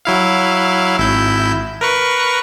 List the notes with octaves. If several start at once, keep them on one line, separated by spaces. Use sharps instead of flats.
F#3 E4 F5
G#1 E4 G6
A#4 B4 C#6